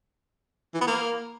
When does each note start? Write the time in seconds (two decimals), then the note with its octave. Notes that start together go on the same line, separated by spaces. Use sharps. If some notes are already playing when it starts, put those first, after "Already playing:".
0.74 E3
0.81 B3
0.87 A#3